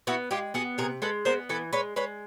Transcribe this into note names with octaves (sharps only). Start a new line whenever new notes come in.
B3 E4 F#4
G#3 F4 G4
B3 F#4 G#4
C3 G#4 A#4
G#3 A4 B4
B3 A#4 C5
E3 A4 B4
G#3 B4 C#5
G#3 B4 C#5